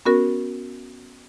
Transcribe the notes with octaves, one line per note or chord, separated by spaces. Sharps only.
B3 C#4 F#4 A#4